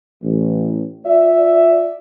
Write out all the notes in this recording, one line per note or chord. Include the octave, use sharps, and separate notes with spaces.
A1
F4 D5 E5